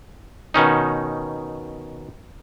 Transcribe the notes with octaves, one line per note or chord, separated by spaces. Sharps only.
B2 D#3 C#4 D#4